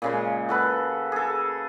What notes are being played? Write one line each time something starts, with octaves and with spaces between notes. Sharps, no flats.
A#2 C#3 G#3
F#4 A4 B4
G#4 A4